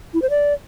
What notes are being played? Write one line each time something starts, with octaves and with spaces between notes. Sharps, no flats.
E4
C5
D5